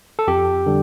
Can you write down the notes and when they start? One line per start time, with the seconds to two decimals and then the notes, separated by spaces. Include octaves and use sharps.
0.19 A4
0.28 F2 G4
0.66 D3 G3